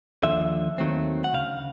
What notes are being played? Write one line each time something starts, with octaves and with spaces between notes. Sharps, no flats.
D#2 D3 F3 E5
D#2 D#3 F#3 A3 C4
F#5
D2 C#3 F5